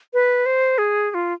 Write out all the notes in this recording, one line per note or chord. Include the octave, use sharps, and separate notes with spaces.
B4
C5
G#4
G#4
F4